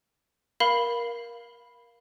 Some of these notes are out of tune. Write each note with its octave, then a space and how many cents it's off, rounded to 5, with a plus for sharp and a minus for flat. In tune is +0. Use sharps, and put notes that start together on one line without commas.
A#4 +15 F5 +0 B5 +0